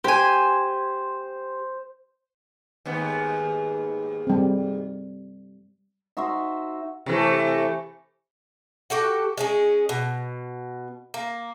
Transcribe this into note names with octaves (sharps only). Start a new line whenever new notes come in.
G4 C5 G#5
D#2 G#2 B3
G3 C4
D#4 F#4 C5 E5
C3 E3 A3
F#4 G4 A4 F#5
G#3 C#4 G#4
B2
A#3